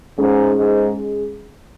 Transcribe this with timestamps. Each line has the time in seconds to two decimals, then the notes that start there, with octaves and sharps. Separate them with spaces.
0.18 G#2 G#3 C#4 G#4
0.54 G#2